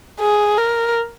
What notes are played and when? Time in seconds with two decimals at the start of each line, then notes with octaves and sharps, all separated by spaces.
0.20 G#4
0.58 A#4